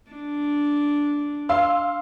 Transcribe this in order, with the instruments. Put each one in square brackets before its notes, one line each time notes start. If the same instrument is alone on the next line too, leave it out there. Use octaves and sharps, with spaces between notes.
[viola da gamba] D4
[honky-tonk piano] F5 C6 E6